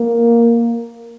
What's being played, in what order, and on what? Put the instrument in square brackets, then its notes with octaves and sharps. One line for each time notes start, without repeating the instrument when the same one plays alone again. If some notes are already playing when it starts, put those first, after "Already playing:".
Already playing: [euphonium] A#3